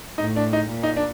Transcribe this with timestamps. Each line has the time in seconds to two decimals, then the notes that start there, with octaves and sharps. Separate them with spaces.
0.18 A2 D#4
0.36 D4
0.53 D#4
0.71 A#2
0.83 D#4
0.97 D4